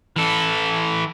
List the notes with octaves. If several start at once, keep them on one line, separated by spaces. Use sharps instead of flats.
E3 A4